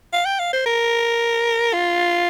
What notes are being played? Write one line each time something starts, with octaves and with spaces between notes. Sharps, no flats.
F5
G5
F5
C5
A#4
F4